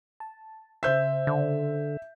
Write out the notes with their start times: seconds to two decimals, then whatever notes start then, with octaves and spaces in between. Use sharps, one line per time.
0.20 A5
0.83 C#3 C5 E5 E6 G6
1.27 D3